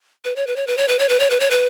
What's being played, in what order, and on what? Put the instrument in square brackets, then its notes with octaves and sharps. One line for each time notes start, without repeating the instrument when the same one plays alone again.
[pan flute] B4
C#5
B4
C#5
B4
C#5
B4
C#5
B4
C#5
B4
C#5
B4